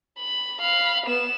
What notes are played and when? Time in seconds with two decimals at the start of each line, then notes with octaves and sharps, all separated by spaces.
0.19 B5
0.60 F5 B5
1.06 B3 E7